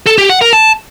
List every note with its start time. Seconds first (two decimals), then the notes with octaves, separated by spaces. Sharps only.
0.06 A4
0.18 G4
0.30 F#5
0.41 A#4
0.53 A5